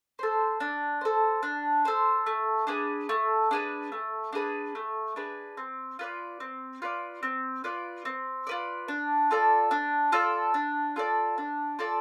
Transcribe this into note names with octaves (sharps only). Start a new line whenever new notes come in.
A4 C5
D4
A4 C5
D4
A4 C5
A3
D4 G#4 B4
A3
D4 G#4 B4
A3
D4 G#4 B4
A3
D4 G#4 B4
C4
F4 B4 D5
C4
F4 B4 D5
C4
F4 B4 D5
C4
F4 B4 D5
D4
F4 A4 D5
D4
F4 A4 D5
D4
F4 A4 D5
D4
F4 A4 D5